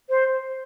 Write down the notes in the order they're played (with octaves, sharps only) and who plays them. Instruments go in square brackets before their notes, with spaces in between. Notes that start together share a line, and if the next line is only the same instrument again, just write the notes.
[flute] C5